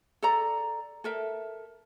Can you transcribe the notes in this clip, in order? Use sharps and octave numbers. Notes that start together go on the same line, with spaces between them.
A4 D5 A#5
A4 A#4 E5